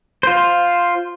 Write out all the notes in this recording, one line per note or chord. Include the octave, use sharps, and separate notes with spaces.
F4 C5